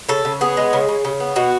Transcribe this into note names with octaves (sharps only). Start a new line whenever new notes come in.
C#3 A4
C#3
B3 G#4
G#3
C#3
C#3
C#3
B3
B2 F#4